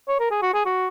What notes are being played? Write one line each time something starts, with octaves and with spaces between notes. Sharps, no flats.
C#5
A#4
G#4
F#4
G#4
F#4